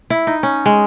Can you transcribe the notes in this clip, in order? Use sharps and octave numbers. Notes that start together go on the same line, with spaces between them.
E4
D#4
C#4
G#3